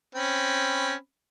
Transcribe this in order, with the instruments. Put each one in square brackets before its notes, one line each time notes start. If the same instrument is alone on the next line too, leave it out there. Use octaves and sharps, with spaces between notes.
[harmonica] C4 C#4 B5